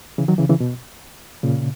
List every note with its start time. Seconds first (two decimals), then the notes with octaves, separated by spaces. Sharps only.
0.18 C#3 E3
0.28 D#3 F#3
0.38 C#3 E3
0.49 C#3 E3
0.60 B2
1.43 A#2 C#3